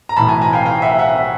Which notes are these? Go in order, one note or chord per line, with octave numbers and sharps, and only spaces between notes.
A#5
B1 A2 E3 A5 B5
G#5 A#5
G#5 A#5
F5 G5
F5 G5
E5 F#5
E5 F#5